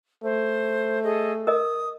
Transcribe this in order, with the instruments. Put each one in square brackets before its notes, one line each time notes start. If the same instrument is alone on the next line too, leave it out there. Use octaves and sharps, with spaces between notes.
[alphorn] A3 [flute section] C5
[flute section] G#4 A4 D#5
[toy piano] A#4 D#5 [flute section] D#6